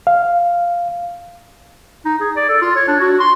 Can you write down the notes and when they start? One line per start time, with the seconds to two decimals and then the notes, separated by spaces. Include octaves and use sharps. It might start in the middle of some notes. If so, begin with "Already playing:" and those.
0.07 F5
2.05 D#4
2.21 G#4
2.36 D5
2.49 A4
2.61 F4
2.76 C#5
2.88 D4
3.00 F#4
3.20 C6